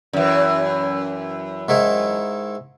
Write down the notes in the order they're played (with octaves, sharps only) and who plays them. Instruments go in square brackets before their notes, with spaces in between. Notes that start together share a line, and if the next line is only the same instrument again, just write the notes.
[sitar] F#2 E3
[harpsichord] G#2 D#3 E4